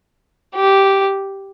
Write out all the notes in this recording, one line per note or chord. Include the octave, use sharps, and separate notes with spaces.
G4